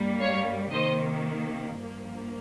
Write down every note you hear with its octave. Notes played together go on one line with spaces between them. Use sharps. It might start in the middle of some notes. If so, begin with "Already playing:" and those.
Already playing: G2 G3 A#3
C#5 F5
C3 D#3 A#3 C5 D#5
G2 F3 A#3